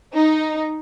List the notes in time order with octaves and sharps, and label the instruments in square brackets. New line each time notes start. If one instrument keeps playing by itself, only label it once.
[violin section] D#4